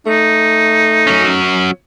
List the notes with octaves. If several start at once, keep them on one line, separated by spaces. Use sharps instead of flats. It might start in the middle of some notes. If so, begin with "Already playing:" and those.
A3 D#4
F#3 C#4